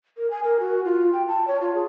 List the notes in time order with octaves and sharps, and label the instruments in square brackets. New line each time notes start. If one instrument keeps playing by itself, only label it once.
[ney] A#4
G#5
A#4
F#4
F4
G5
A5
C#5
F4
G#4